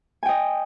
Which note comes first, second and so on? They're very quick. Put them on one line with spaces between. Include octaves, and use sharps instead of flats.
G#5 G5 D#5